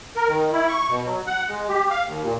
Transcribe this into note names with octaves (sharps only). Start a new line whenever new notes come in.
A#4
D#3
E4
C#6
B2
F#3
F#5
G#3
G4
F5
D#2
A#2